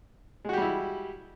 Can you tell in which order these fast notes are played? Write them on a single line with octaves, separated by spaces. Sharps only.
G#3 F#4 G4 G3 E4